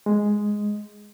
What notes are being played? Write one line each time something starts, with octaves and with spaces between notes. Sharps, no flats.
G#3